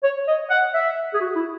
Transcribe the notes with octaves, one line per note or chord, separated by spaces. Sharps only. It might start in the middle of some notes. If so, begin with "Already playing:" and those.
C#5
D#5
F#5
E5
G#4
F#4
E4